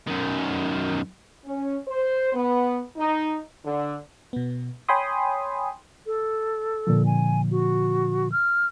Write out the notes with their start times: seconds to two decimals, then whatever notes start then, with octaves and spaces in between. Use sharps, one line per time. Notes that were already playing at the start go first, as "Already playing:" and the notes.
0.07 F#2 D#3
1.45 C#4
1.88 C5
2.34 B3
2.97 D#4
3.65 D3
4.33 B2 B3
4.89 C#5 G5 G#5 B5 C6 D#6
6.07 A4
6.87 A#2 D3 F3
7.06 G#5
7.51 F#4
8.32 F6